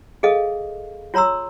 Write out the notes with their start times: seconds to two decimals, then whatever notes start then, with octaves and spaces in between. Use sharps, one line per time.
0.23 G#4 A4 D#5 F5
1.14 F4 C#5 A#5 C6 E6